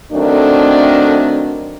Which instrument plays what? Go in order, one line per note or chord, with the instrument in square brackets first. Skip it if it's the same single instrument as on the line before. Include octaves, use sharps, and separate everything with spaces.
[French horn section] D#3 F#3 A3 C4 D4